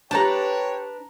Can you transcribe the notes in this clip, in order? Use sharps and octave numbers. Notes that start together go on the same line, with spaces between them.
D4 G4 A4 B4 C#5 G5 A5 A#5